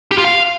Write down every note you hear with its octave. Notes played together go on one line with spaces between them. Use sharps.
G4
F4
F5